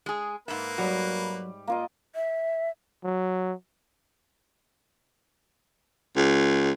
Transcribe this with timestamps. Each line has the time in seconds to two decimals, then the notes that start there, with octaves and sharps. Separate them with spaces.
0.06 G#3 G#4
0.48 G#2 A#3 B4 E5
0.78 F#3 G3 F#4
1.67 A#3 F4 D#5
2.16 E5
3.04 F#3
6.16 C#2